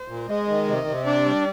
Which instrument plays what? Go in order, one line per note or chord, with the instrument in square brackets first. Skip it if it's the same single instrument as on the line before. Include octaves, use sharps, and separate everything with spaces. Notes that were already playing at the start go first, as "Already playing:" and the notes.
Already playing: [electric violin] C5
[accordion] A#2
[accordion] G#3 [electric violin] D#5
[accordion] D#3
C3
C3
[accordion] D4 [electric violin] D5
[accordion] G3